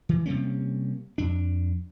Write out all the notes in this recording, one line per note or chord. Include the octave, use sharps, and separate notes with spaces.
E3
C3 G3 A#3 C#4
F2 D4